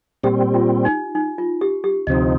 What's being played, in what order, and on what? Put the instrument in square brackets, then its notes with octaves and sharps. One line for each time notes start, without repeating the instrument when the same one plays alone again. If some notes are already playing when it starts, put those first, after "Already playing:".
[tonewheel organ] A#2 G3 C4 [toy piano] G4
[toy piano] F4
D#4
D#4
F4
G4
G4
[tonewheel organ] D2 C3 F3 C4 D#4 [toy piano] D#5